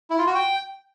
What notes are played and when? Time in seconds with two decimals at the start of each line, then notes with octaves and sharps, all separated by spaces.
0.10 E4
0.18 F4
0.27 F#4
0.35 G5